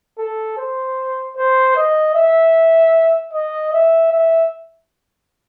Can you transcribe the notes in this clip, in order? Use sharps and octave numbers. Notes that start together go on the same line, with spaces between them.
A4
C5
C5
D#5
E5
D#5
E5
E5